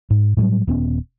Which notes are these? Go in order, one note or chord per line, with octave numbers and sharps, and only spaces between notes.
G#2
A2 F#3 G3
D#1 B3 C#4